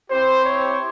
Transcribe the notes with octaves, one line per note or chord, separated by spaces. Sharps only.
C4 E4 G4 C5
C#5